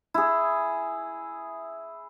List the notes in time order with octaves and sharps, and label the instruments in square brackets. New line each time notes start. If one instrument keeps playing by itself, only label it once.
[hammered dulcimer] E4 G#4